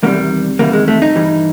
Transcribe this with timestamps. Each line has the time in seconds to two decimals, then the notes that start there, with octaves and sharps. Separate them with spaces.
0.03 E2 C3 D#3 G3 A#3
0.59 E2 C3 D#3 G3 A#3
0.73 G#3
0.88 A3
1.02 D#4
1.15 G2 E3 G3